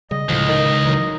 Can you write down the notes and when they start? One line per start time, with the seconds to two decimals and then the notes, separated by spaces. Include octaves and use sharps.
0.11 C#3 G3 D#5
0.29 C#2 A2 D3 F3
0.49 D#3
0.85 E3 F#3 D#4 A#4